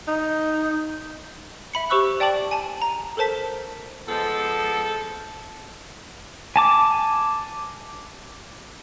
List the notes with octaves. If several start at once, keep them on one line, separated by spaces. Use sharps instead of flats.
D#4
E5 B5 C#7
G4 C5 C#6 E6 F#6
D5 G5 A5 D6 F#7
G#5 A5
A#5
A4 A#4 C5 A5 B6
F3 G#3 B3 A4
G#5 A5 D6